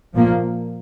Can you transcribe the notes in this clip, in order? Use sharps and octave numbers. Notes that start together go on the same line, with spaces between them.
A#2 F3 A#3